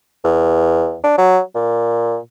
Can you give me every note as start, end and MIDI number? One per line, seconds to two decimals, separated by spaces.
0.24 0.97 40
1.04 1.14 62
1.18 1.40 54
1.55 2.18 46